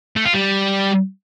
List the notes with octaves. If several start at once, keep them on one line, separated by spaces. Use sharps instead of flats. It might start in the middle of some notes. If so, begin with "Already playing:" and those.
A3
F4
G3